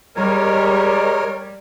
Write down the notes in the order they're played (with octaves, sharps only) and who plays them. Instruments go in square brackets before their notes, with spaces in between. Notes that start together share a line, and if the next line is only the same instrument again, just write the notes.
[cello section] G3 [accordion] G#3 A#4 C#5